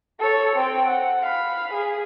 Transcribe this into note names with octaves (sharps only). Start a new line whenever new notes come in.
A4 C#5
C4 G5
F#5
F5 B5
G#4